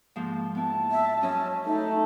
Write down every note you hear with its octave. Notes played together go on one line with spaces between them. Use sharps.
G#2 F3 A#3
B3 E4 A5
E5
F#2 C#4 D#5 E6
A3 D#4